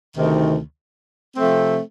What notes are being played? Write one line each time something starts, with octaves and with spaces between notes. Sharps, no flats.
D2 C3 D#3
C3 F3 A3 C4